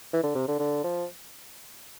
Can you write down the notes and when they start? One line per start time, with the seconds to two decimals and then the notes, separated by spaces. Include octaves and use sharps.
0.13 E3
0.24 D3
0.35 C3
0.48 D3
0.59 D3
0.84 F3